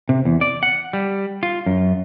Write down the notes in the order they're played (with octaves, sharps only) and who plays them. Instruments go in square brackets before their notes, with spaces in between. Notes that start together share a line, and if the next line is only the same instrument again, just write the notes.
[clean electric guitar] C3
E2
D5
F#5
G3
F4
F#2